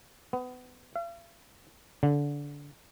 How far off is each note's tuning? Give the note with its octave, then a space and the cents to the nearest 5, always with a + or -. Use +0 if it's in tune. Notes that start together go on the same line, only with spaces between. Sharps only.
B3 +25
F5 -45
D3 -20